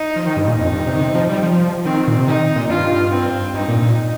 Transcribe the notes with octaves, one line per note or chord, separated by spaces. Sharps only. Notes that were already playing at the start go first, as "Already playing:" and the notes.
Already playing: D#4
F3
D#3
G2
A#2
F2 D#4
G2
C3
D#3
C3
F3
G3
F3
D#3 C4
A#2
C3
D#3 D#4
A#2
G2 F4
C4
G2 D#4
A#2
A#2